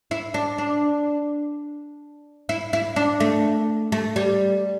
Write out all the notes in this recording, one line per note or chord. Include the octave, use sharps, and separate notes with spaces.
E4
D4
D4
E4
E4
D4
A3
A3
G3